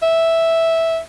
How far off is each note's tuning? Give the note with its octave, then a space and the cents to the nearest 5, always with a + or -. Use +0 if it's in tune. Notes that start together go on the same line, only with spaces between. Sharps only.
E5 -5